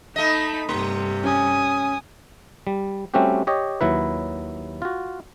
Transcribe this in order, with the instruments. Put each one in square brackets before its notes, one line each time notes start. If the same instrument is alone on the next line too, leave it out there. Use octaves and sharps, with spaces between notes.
[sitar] A3 D#5 [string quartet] D#4 A5 B5
[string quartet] G2 C3 [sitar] A3 [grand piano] C6
[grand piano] C#4 [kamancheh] G#5 D#6
[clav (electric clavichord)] G3
G3 A3 C4 C#4 F#4 G4
G4 C#5 D#5
D#2 F#3 E4 B4
F4 F#4